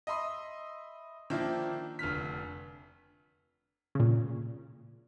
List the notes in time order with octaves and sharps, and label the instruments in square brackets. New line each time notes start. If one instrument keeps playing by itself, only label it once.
[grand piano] D#5 E5 B5 C6 D#6
D#3 F3 A#3 D4 E4
F1 D3 F6 B6
[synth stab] A#2 C#3